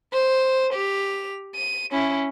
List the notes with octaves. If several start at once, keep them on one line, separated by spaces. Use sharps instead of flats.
C5
G4 F7
D#7
C#4 E4